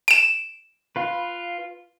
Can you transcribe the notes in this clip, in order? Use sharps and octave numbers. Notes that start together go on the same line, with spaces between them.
D7 E7
F4 B4